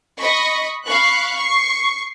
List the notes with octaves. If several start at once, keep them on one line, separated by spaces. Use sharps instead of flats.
D#5 B5 C#6
F5 B5 C#6 F#6
C#6 C7